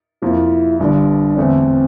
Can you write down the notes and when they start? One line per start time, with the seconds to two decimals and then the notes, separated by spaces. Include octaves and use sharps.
0.22 F2 C3 F3 A#3 E4 F4
0.80 G1 G2 D3 D4
1.37 E2 D3 A3 C4